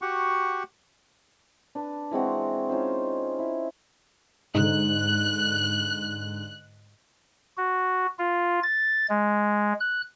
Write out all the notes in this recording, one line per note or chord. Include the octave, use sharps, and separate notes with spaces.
F#4 G4 F#5 C#6
D4 B4
E3 G#3 C4 F#4
C#4 D#4 F4 C5
E4
G#2 D3 D#4 F#6
F#4
F4
A6
G#3
F#6